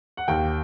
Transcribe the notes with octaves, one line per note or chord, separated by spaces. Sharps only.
F#5
D#2 G5